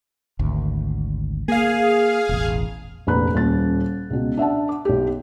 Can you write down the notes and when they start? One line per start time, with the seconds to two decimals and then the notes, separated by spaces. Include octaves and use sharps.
0.39 G#1 D2
1.48 A#3 G#4 F5
2.29 E1 A1
3.07 F1 A#1 B4 A#5 B5 F#6
3.34 D#1 C#4 A6
4.10 C#2 B2
4.37 D4 E5 F#5 A5
4.69 D6
4.85 B1 G4